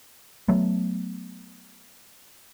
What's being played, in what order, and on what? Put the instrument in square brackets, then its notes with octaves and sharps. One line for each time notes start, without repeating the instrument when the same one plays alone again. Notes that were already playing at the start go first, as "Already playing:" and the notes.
[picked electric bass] F#3 A3 B3